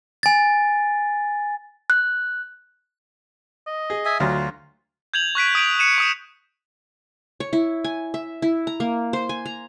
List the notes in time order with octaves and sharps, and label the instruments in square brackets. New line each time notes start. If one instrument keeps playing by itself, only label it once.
[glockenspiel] G#5 A6
[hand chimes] F#6
[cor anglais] D#5
[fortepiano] G#4
[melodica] E5 G#5 D#6
[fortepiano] D2 F#3 [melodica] F4
[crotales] G6 G#6 F7 F#7
C#6 F#6 B6 D7
D#6 D7 F7
C#7 D#7 E7
C#6 D#6 D7
[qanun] C#5
E4
G#5
E5
E4
A#5
A#3
C5
G#5
A#5